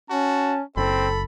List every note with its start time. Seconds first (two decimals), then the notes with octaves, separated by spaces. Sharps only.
0.10 C#4 F#4 A5
0.77 F#1 C4 A4 B5